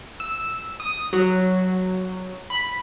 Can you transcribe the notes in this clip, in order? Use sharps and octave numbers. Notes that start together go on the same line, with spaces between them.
E6
D#6
F#3
B5